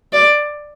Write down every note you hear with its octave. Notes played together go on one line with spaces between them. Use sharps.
D5